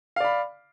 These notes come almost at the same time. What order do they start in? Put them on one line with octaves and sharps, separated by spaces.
F5 D5 B5